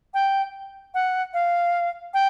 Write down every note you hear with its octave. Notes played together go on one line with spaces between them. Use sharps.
G5
F#5
F5
G5